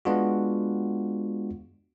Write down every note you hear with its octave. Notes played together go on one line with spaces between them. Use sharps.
G#3 B3 D4 F4 F#4